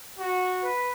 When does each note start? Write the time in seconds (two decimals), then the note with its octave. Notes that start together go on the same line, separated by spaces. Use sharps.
0.19 F#4
0.63 B4